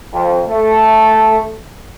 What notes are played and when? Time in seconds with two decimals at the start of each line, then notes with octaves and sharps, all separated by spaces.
0.13 F2
0.48 A3